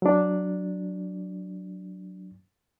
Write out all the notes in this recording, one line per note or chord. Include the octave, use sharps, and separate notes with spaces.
F#3 D4